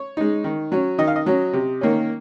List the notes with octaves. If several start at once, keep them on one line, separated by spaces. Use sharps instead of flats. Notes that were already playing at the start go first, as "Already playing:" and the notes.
Already playing: C#5
G#3 D#4
D#3
F#3 C#4
D#3 D#5
F5
D#5
F#3 C#4
C3
D#3 A#3 C#4